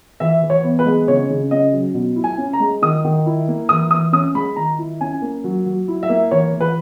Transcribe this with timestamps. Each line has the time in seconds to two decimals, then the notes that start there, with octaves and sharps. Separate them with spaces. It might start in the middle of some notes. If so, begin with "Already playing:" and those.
0.20 E3 E5
0.42 E3
0.50 C#5
0.63 B3
0.79 B4
0.86 G#3
1.08 C#3 C#5
1.30 C#3
1.51 C#4 D#5
1.73 F#3
1.94 B2
2.16 E4
2.24 G#5
2.38 C#4
2.53 A#5
2.60 G#3
2.82 D#3 D#6
3.05 D#3
3.26 E4
3.48 A#3
3.69 E3 D#6
3.91 E3 D#6
4.13 C#4 D#6
4.34 G#3 B5
4.56 D#3 A#5
4.79 E4
5.01 C#4 G#5
5.22 A#3
5.44 F#3
5.66 F#3
5.88 E4
6.03 E5
6.09 A#3
6.31 E3 C#5
6.53 E3
6.61 B4